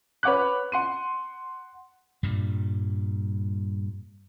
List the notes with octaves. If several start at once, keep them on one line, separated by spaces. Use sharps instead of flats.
B4 C#5 F#5 D6 F#6
F#5 C6 D#7
G2 A#2 G3